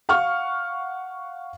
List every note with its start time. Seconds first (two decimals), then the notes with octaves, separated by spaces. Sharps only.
0.09 F5 F#5 C#6 F6